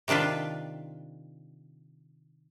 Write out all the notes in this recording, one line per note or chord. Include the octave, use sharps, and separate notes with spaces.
C3 D#3 D4 F4 B4